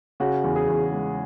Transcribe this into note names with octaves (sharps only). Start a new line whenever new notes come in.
C#3 F#4
E2
G#4
E2
G#3